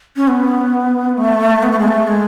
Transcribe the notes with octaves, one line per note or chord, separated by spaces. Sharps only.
C#4
B3
A3
B3
A3
G#3
A3
G#3